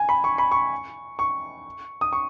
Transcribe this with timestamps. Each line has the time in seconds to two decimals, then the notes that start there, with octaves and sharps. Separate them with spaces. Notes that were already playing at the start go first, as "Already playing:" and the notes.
Already playing: G#5
0.09 B5
0.24 C#6
0.38 B5
0.51 C#6
1.19 C#6
2.01 D#6
2.13 C#6